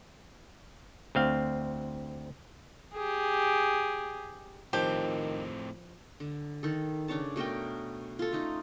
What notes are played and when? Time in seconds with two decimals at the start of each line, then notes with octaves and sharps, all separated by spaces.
1.15 D2 C4 F5
2.94 G4 G#4
4.73 A2 D#3 F3 C4 G4
6.20 D3
6.63 D#3 A4
7.08 C#3 D4 C#5 A5
7.36 B2 A3 A#4 G5
8.19 F4 A4
8.33 A3 C#4 D#4